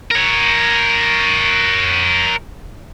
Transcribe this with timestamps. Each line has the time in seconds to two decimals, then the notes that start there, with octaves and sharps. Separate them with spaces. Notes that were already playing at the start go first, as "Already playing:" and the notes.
0.11 A#4 C#5